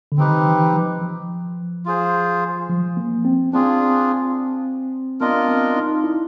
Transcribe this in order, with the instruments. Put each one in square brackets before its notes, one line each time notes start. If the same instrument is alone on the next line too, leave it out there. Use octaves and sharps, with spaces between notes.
[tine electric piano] D3
[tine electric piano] D#3 [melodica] C4 D#4 G4 B4
[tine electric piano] E3
F3
F3
[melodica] F4 G#4 C5
[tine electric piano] F3
A#3
C4
[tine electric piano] C4 [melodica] D4 F4 G#4
[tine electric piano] B3 [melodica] D4 F4 A#4 D#5
[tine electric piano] C4
D#4
E4